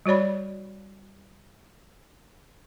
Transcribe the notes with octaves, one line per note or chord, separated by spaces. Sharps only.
G3 F#4 C#5 D5 B5